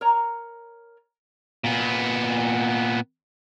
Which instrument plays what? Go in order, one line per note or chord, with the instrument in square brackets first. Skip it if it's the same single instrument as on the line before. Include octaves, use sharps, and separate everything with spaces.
[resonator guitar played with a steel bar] A#4 C#5 A#5
[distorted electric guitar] A#2 B3